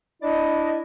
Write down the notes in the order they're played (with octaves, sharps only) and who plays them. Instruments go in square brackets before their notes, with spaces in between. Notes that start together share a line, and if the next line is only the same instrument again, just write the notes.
[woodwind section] D4 E4 D5 D#5